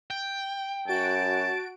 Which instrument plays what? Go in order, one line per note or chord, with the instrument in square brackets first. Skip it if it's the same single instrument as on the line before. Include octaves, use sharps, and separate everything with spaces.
[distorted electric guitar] G5
[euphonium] F#2 [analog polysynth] F#4 D7 [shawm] A5